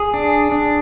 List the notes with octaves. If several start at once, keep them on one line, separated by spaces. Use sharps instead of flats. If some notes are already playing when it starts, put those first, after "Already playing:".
Already playing: G#4
D4
D4